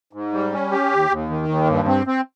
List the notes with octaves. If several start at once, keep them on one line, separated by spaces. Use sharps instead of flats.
G#2
G3
C#4
G4
D#2
D#2
D#3
D#2
G2
C4
C4